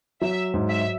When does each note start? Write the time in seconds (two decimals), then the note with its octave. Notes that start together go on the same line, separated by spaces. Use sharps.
0.21 F#3 E5
0.54 G#2
0.69 E5